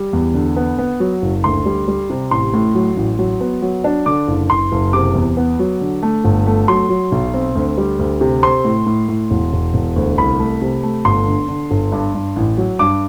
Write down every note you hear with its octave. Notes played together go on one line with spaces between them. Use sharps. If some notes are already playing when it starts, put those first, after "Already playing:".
Already playing: G3
E2
D3
B3
B3
F#3
F#1
D2 C6
G3
G3
C3
A1 C6
A2
F#3
A1
F#3
B3
F#3
D4
D3 D6
F#1
F#1 C6
F#1
C3 D6
E2
B3
F#3
D3
A3
G1
A3
F#3 C6
F#3
B1
C4
D2
G3
D2
C3
C4 C6
A2
A2
A2
E1
E1
E1
D2
C2 B5
A3
C3
A3
G1 C6
D3
D3
G1
G2
G2
A1
F#3
G2 D6